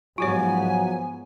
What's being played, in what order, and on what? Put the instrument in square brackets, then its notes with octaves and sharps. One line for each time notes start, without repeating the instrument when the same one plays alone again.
[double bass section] G#2 B3 [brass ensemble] F3 F#3 [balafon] F4 G4 C#5 [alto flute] G#5